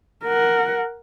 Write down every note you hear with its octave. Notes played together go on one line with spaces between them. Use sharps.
A#4 F#5